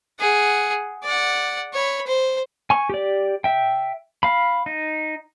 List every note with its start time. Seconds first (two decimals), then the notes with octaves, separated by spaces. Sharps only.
0.19 G#4 F#5
1.04 D5 F#5
1.74 C#5 B5
2.07 C5
2.70 G#5 C#6
2.90 G4 D5
3.44 E5 G5
4.23 F5 B5
4.66 D#4